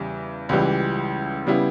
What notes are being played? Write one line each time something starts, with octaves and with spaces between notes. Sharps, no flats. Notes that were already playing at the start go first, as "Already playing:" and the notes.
Already playing: E2 C#3 G3
C#2 C#3 E3 G3
C#3 G3 B3 E4